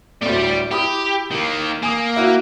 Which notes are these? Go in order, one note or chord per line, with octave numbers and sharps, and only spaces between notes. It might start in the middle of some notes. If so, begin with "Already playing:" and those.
D2 A2 G3 D5
E4 G4 B5 D#6
D#3 A#3
A#3 G#5 D#6
E4 F#4